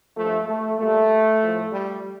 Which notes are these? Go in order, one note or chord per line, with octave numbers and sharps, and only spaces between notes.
G2 F3 A3
A3
A#2 G3 A3
A2 F3
G3